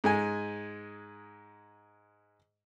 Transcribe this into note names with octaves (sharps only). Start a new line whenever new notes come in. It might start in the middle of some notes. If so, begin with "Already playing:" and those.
G#2 G#3 G#5